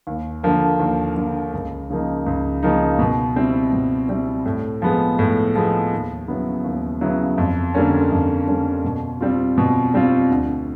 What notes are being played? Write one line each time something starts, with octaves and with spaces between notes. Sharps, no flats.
D#2
D3 F3 A#3
D#2
D3 F3 A#3
C#2
C#3 F3 A#3 D#4
C#2
C#3 F3 A#3 D#4
B2
G3 C4 E4
B2
G3 C4 E4
A2
F3 G#3 B3
A2
F3 G#3 B3
D#2
C#3 F#3 B3 E4
D#2
C#3 F#3 B3 E4
F2
D3 G3 A#3 C#4
F2
D3 G3 A#3 C#4
B2
G3 C4 F4
B2
G3 C4 F4
D2